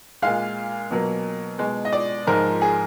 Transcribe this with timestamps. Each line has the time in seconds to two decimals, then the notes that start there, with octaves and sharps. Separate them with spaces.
0.22 A#2 G#3 F5
0.91 B2 F#3 A#3
1.58 B2 G#3
1.85 D#5
1.92 D5
2.27 G#2 F3 G#3 A#4
2.61 G#4